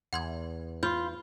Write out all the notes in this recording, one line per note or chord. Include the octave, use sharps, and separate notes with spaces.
E2 F#5 C6 G#6
F4 B5 C6 G6